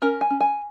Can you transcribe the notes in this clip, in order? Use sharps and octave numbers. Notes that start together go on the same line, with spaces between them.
C#4 A#4
G#5
C#4
G#5